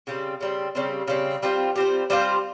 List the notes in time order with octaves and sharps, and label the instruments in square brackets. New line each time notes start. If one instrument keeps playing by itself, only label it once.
[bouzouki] C#3 G3 C4
C#3 G3 C4
C#3 G3 C4
C#3 G3 C4
G3 C4 F4 C5
G3 C4 F4 C5
G3 C4 F4 C5